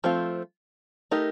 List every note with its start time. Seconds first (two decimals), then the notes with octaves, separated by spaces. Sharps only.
0.04 F3 A3 C4 F4
1.11 A3 D#4 G4 A#4